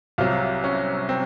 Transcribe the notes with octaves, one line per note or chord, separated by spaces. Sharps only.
C2 C3 F#3 F4
C#4
C4